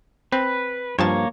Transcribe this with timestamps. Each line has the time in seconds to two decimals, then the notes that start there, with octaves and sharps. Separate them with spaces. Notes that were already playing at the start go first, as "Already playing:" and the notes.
0.32 C4 B4
0.99 G2 F3 A#3 C#5 A5